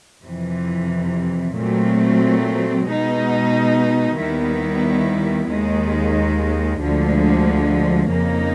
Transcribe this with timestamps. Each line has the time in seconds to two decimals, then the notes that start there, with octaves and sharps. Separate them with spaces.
0.24 F2 C3 E3
1.55 A#2 F#3 A3 C4
2.85 B2 G#3 B3 D#4
4.17 D#2 D#3 G3 B3 E4
5.48 D#2 D#3 G#3
6.80 D2 D3 F3 G#3
8.11 F2 C#3 F3 A#3 D#4